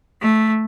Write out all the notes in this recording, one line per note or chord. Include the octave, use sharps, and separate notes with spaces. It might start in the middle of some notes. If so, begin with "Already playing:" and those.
A3